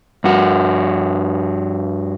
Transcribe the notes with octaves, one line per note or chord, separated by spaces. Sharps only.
G2 F#4